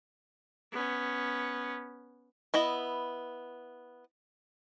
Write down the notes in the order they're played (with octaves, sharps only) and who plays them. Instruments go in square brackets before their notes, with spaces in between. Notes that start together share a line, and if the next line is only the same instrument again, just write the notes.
[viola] B3 C#4
[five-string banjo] B3 E4 D#5